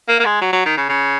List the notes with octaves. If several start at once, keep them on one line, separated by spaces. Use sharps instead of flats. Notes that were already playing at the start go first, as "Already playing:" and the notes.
A#3
A#3
G#3
F#3
F#3
D#3
C#3
C#3